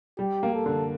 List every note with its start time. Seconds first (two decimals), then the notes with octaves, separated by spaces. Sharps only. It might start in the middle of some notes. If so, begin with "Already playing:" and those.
0.19 G3 G4
0.43 A#3
0.54 A4
0.66 D3